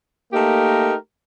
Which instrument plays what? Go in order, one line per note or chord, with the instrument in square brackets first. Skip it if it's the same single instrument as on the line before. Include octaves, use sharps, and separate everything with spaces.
[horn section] A3 A#3 D#4 G4 A#4